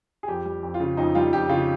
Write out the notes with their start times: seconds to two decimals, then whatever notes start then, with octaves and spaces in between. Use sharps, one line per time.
0.23 G#4
0.28 F2 G4
0.45 G3
0.63 F2
0.74 F4
0.80 C#3
0.97 F2 D#4
1.15 G3 F4
1.33 F2 G4
1.49 C#3 F4